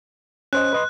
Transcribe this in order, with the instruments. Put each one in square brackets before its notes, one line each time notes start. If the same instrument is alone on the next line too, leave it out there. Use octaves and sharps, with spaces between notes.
[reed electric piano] C#4 C5 D#5 [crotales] F#6
[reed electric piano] B4 D#5 C6